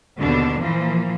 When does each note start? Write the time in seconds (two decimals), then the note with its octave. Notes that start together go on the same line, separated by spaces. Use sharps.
0.17 D#2 B2 D3 D4
0.60 A#2 E3 F3 A#3